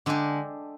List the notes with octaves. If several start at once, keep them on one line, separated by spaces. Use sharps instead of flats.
D3 G#3 D4 G4